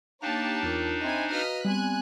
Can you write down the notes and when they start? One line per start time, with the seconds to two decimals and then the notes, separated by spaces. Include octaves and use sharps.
0.22 A#3 D4 D#4 G4 C#5 F5 A5
0.63 E2 F4 A#4
1.01 C4 D#5 E5 G#5 A#5 B5
1.31 F#4 B4 D#5 F5 F6 B6
1.65 G3 B3 C4 G#5 F#6